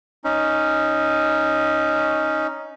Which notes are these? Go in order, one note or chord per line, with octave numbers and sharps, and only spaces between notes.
C#4 D#4